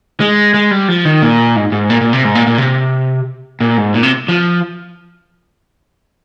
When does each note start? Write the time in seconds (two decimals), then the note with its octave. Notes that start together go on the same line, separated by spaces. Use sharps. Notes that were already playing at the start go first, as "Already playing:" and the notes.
0.20 G#3
0.54 G#3
0.71 G3
0.88 F3
1.05 D#3
1.22 A#2
1.56 G#2
1.72 G#2
1.90 A#2
2.01 A#2
2.13 C3
2.24 G#2
2.35 A#2
2.47 A#2
2.58 C3
3.60 A#2
3.77 G#2
3.94 A#2
4.03 C3
4.28 F3